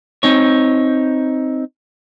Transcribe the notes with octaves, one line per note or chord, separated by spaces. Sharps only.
C4 D#4 C#5